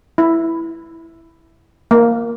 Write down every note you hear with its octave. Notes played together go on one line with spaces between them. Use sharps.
E4
A#3